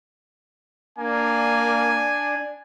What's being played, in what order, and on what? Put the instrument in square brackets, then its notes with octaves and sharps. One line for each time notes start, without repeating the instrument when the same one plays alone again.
[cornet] A#3 [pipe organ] D4 [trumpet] G#5